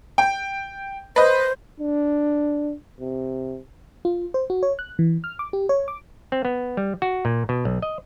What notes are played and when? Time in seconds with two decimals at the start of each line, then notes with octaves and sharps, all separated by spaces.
0.18 G5
1.16 B4 C5 D#5
1.80 D4
3.00 C3
4.05 F4
4.34 C5
4.50 F#4
4.63 C#5
4.79 F#6
4.99 E3
5.24 F6
5.39 D6
5.53 G4
5.69 C#5
5.88 D6
6.32 C4
6.45 B3
6.77 G3
7.02 F#4
7.25 A#2
7.49 B2
7.65 B1
7.82 D#5